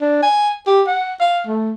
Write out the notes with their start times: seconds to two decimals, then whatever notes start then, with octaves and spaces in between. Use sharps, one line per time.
0.01 D4
0.22 G#5
0.67 G4
0.87 F#5
1.20 F5
1.47 A3